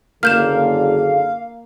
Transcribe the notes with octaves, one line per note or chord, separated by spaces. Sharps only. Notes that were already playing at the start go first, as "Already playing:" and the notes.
F#1 D3 A#3 G#4 F5 F6 G6 E7